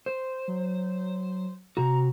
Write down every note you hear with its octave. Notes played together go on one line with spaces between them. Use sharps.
C5
F#3
C3 F#4 A#5